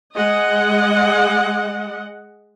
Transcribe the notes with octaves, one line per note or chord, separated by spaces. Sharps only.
G#3 D#5 F#5